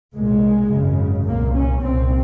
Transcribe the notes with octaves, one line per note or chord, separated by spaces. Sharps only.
C2 A#2 G#3
G#1 F#2 C#3
C2 A#2 A#3
C#4
C2 A#2 C4